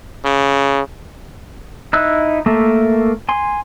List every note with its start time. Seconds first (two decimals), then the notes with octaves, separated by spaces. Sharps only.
0.25 C#3
1.93 D#4 E4 E6 F#6
2.46 A3 A#3 A#4 E5
3.29 G#5 C6